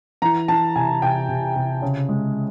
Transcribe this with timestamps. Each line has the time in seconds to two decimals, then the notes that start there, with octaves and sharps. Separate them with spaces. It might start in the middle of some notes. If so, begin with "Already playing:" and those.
0.22 E3 A#5
0.48 E3 A5
0.76 C3 G#5
1.02 C3 G5
1.29 C3
1.56 C3
1.82 C#3
2.09 G#3